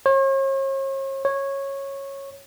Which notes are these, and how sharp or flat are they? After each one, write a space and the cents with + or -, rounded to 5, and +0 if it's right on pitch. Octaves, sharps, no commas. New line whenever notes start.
C#5 -45
C#5 -15